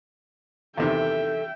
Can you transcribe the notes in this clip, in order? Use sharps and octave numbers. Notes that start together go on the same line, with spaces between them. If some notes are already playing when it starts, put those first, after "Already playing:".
E2 C3 D#3 A4 E5 G5